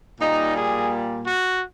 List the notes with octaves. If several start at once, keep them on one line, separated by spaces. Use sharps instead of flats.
A#2 G3 A#3 D#4
G#4
F#4